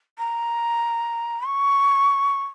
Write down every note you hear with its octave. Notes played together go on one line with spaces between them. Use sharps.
A#5
C#6